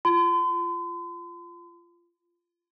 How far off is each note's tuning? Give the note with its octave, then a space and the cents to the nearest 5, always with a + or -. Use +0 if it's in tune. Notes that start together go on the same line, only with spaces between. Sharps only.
F4 -15 C6 -45